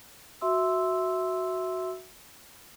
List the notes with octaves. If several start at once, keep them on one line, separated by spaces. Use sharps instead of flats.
F#4 E5 C6 E6